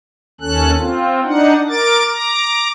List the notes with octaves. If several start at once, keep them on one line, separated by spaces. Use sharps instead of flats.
D#2 C#4 A4 F#6
C4 F4
D4 D#4 F#5
A#4 D6 A6
A#5 D6